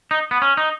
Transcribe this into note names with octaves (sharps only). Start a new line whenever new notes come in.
D#4
B3
C#4
D#4